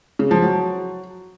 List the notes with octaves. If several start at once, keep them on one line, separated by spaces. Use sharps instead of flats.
C#3
F3
F#3